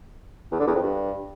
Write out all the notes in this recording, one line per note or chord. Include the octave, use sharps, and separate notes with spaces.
E2
D3
E2
F2
G2